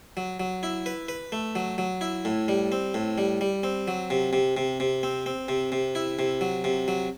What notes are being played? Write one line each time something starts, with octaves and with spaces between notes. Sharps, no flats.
F#3
F#3
E4
B4
B4
A3
F#3
F#3
E4
A2
G3
C4
A2
G3
G3
C4
F#3
C3
C3
C3
C3
C4
C4
C3
C3
E4
C3
F#3
C3
F#3